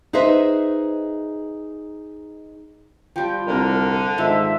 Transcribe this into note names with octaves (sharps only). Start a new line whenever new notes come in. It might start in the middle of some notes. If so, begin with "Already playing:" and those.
D#4 G#4 B4 C5 D#5 E5
F3 G3 G5
C2 D3 A#4
G#2 D#3 F3 D4 E5